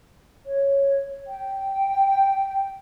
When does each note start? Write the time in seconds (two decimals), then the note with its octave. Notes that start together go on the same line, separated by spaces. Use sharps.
0.45 C#5
1.27 G5